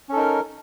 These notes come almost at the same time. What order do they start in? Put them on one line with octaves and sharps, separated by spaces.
C#4 A4 D#4 A#4